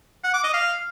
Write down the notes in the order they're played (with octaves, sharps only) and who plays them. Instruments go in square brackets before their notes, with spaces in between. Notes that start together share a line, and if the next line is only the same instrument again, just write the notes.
[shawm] F#5
D6
D#5
F5